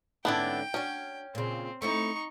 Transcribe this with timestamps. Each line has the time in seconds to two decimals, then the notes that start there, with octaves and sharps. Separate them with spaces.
0.25 G#2 D3 B3 C#4 D4 E4 G5
0.74 C#4 D4 F#4
1.35 A#2 C#3 C4
1.82 A3 C4 D#4 E4 C#6